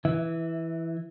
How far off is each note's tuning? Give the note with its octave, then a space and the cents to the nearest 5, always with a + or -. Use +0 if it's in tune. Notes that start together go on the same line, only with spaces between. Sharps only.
E3 +0 E5 -15